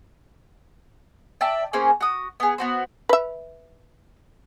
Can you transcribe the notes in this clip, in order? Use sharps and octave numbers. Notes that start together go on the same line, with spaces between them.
D5 E5 G5 A5
A#3 C#4 G#4 C5
F#4 D#6
B3 G#4
B3 F#4 C5
B4 E5